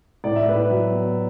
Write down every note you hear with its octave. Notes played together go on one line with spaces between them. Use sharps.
A2 D5
E5
A2 B4 D5
F#3
B3